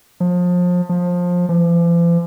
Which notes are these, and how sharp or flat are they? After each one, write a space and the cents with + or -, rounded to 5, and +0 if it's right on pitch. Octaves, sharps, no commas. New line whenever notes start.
F3 +30
F3 +20
F3 -45